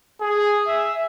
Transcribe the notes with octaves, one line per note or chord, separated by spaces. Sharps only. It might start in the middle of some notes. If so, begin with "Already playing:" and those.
G#4
E5